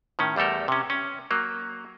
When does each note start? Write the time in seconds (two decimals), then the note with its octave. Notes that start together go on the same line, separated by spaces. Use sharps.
0.19 A2 D#3 C#4
0.36 E2 G3 A3 A4 A#4
0.68 C3 C#4
0.90 C#4
1.31 F#3 A#3